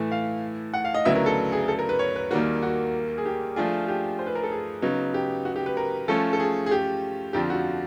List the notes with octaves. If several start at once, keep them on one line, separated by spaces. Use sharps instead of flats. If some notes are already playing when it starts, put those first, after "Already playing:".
Already playing: A2 E3 A3
F5
F#5
F5
D#5
D2 C#3 F#3 B3 E4 E5
A#4
A4
G#4
A4
A#4
B4
C#5
B4
D#2 D#3 G3 A#3 F#4
F#4
G#4
G4
F3 A3 D4 F4 G#4
G4
C5
B4
A#4
A4
G#4
C#3 F#3 B3 D#4
G4
F#4
G4
B4
A#4
F3 A3 C#4 A4
A4
G#4
G#4
G4
F2 D3 F3 G4
F#4